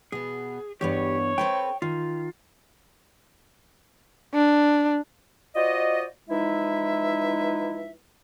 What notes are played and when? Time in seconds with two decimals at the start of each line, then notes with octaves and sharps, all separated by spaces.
0.12 B2 B3 G#4
0.81 E2 G2 B3 G4 C#5
1.38 C4 A4 B4 G5
1.82 D#3 F4
4.34 D4
5.55 F4 F#4 C5 D5 D#5
6.30 E3 F3 G#3 D#4 E4 E5